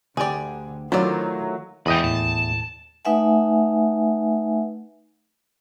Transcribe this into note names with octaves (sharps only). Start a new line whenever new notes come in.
D2 D3 G4 G#4 D5
D#3 F#3 A3 E4 F4 C5 D5
E2 G#2 B4 D#5 G5
D#2 A2 A5
A3 D#4 B4 E5 F#5 G#5